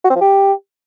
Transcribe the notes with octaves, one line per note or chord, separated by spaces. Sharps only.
F#4
C4
F3
G4